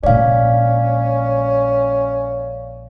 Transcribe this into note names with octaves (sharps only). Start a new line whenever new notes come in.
A#1 G#3 C#4 D5 F5